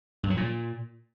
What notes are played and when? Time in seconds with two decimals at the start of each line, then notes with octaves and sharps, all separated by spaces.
0.23 G2
0.30 F#3
0.37 A#2